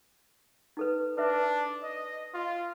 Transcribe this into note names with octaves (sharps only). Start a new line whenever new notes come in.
D#4 A4 B4
D4 B4 E5
D#5
F4